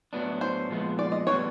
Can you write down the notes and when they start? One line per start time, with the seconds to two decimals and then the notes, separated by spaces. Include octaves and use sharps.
0.13 A2 F#3 B3 D4
0.41 C5
0.70 A#2 F3 G#3 B3
0.99 D5
1.12 D#5
1.27 A2 E3 G3 B3 D4 C#5